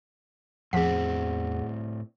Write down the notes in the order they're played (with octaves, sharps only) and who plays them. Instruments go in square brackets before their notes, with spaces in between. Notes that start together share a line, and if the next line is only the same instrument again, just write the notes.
[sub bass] E2 [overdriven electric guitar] A2 C4 [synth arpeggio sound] F3 B6 [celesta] G#4 F#5